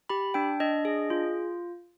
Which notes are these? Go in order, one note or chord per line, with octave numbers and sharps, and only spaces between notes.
G4 B5
D4 G5
D4 D#5
G#4
F4